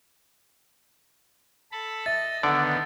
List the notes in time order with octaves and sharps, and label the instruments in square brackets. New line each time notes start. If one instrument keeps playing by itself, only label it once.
[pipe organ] A4 A5 B5
[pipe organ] D#5 [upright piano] E5 [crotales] A6
[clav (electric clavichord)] D3 D5 [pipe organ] D#3 B3 [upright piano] F#5